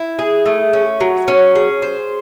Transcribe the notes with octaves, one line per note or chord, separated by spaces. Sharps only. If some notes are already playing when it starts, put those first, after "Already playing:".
Already playing: E4
G#4
A3
C#4
F#3
C#4
G#4
C5